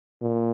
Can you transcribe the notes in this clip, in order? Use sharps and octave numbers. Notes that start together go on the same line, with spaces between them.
A#2